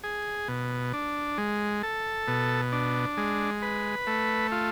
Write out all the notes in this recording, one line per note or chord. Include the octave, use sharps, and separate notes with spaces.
G#4
B2
D4
G#3
A4
B2
D4
G#3
B4
A3
F4